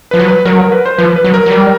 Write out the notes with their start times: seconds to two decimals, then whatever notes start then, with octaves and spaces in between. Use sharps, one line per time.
0.11 F3 B4
0.19 F#3
0.28 B4
0.45 F#3 A#4
0.59 A#4
0.72 B4
0.86 C5
0.98 F3 B4
1.16 B4
1.24 F#3
1.34 A#4
1.46 F#3
1.51 G3